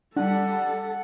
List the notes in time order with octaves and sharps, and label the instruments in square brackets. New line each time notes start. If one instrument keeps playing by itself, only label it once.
[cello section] G3 [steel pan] D4 [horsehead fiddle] A4 [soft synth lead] F#5